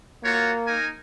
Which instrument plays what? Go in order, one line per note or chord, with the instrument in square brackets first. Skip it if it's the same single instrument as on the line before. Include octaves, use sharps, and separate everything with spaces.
[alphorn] A#3 [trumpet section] F4 F#4 C#5
[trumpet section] D#4 A#4 G#5